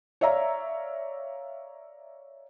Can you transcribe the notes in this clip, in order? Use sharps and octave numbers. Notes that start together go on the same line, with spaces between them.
C#5 D5 E5 F5 A#5